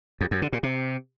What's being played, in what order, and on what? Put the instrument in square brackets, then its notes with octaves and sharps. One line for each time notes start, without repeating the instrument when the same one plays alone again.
[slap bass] F2
F#2
D3
A#2
C3